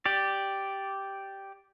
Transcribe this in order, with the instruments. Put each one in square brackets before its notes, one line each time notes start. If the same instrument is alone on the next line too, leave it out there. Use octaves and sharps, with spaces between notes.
[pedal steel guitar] G4 D5